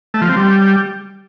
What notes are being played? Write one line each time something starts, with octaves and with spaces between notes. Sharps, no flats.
A3
F3
C4
G3